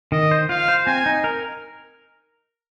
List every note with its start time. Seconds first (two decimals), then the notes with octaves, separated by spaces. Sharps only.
0.12 D#3 D#5
0.31 C5
0.49 F4 F5
0.68 C5
0.87 C4 G#5
1.06 D#4
1.24 A#4